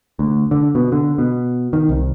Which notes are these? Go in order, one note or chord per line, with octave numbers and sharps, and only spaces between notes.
D2
D3
B2
D3
B2
D#3
C2